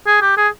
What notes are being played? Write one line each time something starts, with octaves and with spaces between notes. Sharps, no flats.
G#4
G4
G#4